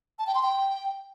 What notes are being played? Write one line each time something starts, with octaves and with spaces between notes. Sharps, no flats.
A5
G5
C6
G5